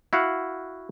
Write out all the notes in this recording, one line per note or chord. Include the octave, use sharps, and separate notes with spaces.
E4 F#4 F5 F#5